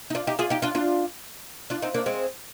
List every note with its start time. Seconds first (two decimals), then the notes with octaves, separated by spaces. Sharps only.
0.10 D#4
0.15 D4 F4
0.27 D#4 G4
0.39 F4 G#4
0.50 D#4 G4
0.62 D4 F4
0.75 D4 F4
1.70 D4 F4
1.82 C4 D#4
1.94 A#3 D4
2.06 G#3 C4